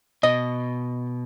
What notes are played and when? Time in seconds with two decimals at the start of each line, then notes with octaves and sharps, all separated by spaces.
0.23 B2 D#5